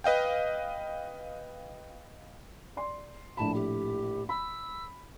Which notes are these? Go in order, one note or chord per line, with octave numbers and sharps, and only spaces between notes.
B4 D#5 F5 G5
D5 C6
A#1 A2 A5 B5
G4
B5 E6